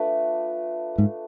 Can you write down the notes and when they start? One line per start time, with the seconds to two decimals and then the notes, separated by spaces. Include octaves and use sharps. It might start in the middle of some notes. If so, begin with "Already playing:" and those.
Already playing: A3 D4 F4 B4
0.98 G#2